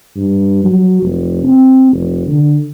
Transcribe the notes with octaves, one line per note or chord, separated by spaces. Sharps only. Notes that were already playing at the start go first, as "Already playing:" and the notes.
G2
F#3
F1
C4
F1
D3